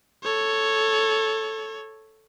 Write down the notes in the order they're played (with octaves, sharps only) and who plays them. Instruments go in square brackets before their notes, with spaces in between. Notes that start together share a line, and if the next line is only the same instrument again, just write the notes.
[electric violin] A4 C#5